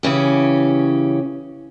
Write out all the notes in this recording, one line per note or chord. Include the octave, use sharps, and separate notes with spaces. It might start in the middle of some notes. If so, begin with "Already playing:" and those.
C#3 E3 C#4 G4